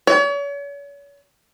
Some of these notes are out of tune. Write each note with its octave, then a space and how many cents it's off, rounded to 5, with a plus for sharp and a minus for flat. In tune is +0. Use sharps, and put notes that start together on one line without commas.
C#5 +40